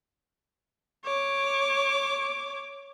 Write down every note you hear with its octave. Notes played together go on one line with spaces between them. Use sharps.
C#5 D6